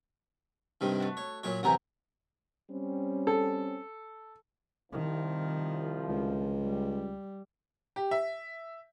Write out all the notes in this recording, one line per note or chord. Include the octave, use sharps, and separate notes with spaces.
G2 C3 D#3
A3 F#4
C#5
A#2 F#3 C#5
F#2 C3 E3 F#5 A#5 G6
G3 C4 C#4
A4
C2 D#3 F3
C#2
G3
G4
E5